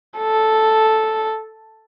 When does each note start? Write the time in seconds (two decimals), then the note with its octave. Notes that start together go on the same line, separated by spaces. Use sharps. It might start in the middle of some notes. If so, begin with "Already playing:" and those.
0.18 A4